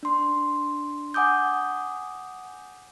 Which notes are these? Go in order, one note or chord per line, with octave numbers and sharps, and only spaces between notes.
D4 C6
F#5 G#5 D6 D#6 G6